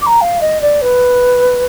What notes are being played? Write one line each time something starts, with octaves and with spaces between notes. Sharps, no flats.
D6
A#5
F5
D#5
D5
B4